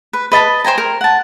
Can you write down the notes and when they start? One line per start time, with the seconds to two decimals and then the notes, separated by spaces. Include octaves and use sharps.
0.13 B4
0.32 B4 D#5 A5 B5
0.64 C5 G5 G#5 A#5
0.78 A#4
1.01 F#5 A5